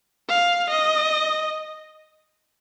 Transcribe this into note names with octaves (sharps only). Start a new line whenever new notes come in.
F5
D#5